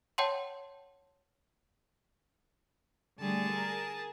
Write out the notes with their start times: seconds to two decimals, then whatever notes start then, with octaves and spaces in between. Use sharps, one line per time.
0.18 C#5 F#5 G5 A5 C6
3.19 D3 G3 A3 G#4 A5
3.52 A#4